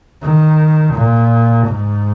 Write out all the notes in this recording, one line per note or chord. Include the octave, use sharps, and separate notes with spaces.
D#3
A#2
G#2